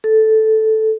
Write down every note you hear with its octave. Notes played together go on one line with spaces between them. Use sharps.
A4